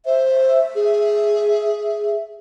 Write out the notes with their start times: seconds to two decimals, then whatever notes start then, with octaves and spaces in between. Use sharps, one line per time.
0.06 C5 E5
0.75 G#4